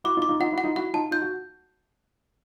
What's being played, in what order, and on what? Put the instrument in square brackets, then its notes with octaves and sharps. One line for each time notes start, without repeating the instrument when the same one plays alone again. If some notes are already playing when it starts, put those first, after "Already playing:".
[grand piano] E4 F#4 [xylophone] D6
[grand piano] D#4 F4
[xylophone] D6
[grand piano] D#4 F4
[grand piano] D#4 F4 [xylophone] F#5
[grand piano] E4 F#4
[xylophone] F#5
[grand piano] D#4 F4
[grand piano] E4 F#4 [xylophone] F#5
[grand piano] D#4 F4 [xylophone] A5
[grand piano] D#4 F4 [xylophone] G6
[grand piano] F#4